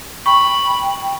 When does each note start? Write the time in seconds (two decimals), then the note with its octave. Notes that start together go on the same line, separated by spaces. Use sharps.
0.26 G5 B5 C#6